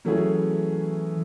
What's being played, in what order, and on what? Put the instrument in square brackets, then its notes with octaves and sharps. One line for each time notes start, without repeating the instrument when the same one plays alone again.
[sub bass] E3 [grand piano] F#3 A3 C#4 E4 G#4